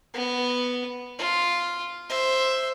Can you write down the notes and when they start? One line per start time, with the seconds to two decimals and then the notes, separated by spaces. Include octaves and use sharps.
0.14 B3
1.19 F4
2.09 C5 E5